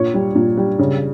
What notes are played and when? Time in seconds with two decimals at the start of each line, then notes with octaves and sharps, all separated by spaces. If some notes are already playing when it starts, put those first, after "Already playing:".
Already playing: A#2 C#5
0.14 G3
0.35 A#2
0.57 G3
0.79 C#3